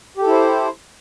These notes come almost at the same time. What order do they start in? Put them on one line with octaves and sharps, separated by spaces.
G4 A4 E4 C5